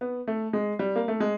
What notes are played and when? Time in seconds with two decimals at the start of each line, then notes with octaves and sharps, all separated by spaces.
0.01 B3
0.27 A3
0.53 G#3
0.79 G3
0.96 A#3
1.08 A3
1.20 G#3